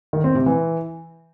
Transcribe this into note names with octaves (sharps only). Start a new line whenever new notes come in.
D#3
C4
C3
E3